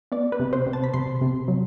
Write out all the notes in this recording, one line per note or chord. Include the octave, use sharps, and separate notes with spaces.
B3 D5
B4
C3
C5
C3
A5
B5
C3 C6
C3
F#3